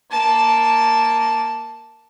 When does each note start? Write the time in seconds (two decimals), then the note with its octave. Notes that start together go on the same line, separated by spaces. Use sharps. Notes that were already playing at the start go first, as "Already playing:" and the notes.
0.12 A#3 A5